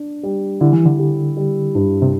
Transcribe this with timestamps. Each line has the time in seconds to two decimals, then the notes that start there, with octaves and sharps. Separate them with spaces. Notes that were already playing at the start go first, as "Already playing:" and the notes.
Already playing: D4
0.23 G3
0.60 D3 E4
0.73 E3
0.86 D3
0.98 G4
1.37 G3
1.75 G2
2.02 C3